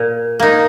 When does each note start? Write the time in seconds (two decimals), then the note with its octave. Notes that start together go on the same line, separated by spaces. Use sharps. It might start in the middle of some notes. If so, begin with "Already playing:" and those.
Already playing: A#2
0.40 A#3 D#4